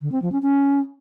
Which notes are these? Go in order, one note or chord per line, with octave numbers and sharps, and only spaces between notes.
D3
C4
F3
C#4
C#4